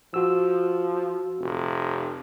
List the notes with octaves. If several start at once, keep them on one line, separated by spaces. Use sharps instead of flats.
F3 F#4 E6
F1